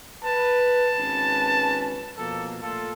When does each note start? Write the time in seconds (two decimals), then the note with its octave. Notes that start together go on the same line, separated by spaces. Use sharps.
0.24 B4 A5
0.98 G#1 C#4 B4
2.18 B2 F3 A#3 A4
2.61 A#2 A3 F4 A4